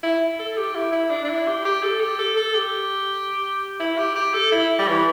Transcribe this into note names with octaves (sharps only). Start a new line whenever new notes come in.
E4
A4
G4
E4
E4
D4
D4
E4
G4
G4
A4
G4
A4
A4
G4
E4
G4
G4
A4
E4
G3
E3